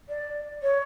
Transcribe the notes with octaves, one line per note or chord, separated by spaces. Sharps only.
D5
C#5